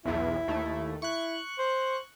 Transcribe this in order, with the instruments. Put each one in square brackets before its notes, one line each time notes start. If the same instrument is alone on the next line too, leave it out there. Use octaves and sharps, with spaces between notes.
[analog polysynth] B1 E2 [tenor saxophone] E4
[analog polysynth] D#2 A3
[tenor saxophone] E4 [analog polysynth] C#6 F#6
[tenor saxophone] C5